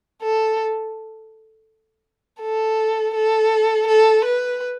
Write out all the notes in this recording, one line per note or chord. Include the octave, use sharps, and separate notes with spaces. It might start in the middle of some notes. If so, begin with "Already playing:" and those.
A4
A4
A4
A4
B4